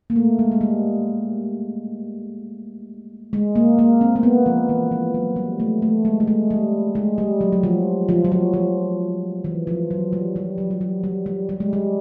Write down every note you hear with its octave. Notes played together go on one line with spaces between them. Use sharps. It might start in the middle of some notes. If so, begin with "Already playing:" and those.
A#3
A3
G#3
G#3
G3
G#3
A#3
A#3
C4
A#3
B3
F3
E3
F3
F#3
G3
A3
A3
G#3
A3
G#3
G3
G#3
G3
F#3
F#3
F3
F3
F#3
F3
F3
E3
F3
F#3
G3
G3
F#3
G3
F#3
G3
G3
G3
G#3
G3